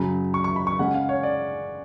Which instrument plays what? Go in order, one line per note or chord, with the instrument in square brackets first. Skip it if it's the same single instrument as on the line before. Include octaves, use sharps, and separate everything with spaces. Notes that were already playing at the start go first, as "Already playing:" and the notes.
Already playing: [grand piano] F#2 C#3 F#3
C#6
C#6
B5
C#6
C#3 G#3 C#4 F#5
F5
C#5
D5